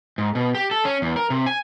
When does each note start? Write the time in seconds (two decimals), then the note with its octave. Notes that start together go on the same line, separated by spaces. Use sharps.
0.18 G#2
0.35 B2
0.55 G4
0.71 A4
0.85 C#4
1.02 E2
1.16 A#4
1.30 C3
1.46 G#5